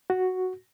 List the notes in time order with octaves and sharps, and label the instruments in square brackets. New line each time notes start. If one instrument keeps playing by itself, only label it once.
[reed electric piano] F#4